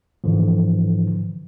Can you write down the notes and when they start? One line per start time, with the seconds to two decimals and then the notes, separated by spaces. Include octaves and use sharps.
0.24 G#2 D3 E3 F3